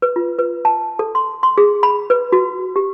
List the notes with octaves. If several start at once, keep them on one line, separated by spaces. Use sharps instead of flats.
B4
F4
B4
A5
A4
C6
C6
G#4
B5
B4
F#4
G4